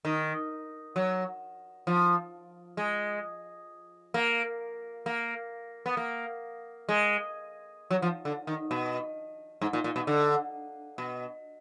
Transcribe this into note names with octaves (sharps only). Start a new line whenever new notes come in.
D#3
F#3
F3
G#3
A#3
A#3
B3
A#3
G#3
F#3
F3
D3
D#3
B2
G#2
A#2
A#2
B2
D3
B2